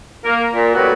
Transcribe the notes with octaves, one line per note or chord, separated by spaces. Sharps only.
A#3 A#4
A#2
F#2 A2 F#3 G3 B3 F#4